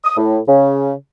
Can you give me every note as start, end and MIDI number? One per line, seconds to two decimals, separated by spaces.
0.04 0.17 87
0.17 0.37 45
0.47 0.91 49